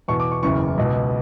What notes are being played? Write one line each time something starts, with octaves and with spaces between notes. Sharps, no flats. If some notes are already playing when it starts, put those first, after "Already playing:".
E2 B2 C#6
D6
C#6
F#1 E2 C#3 E3 C#6
C#2 B2